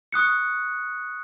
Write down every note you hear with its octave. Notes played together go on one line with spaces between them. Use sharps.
C#6 D#6 F#6 C#7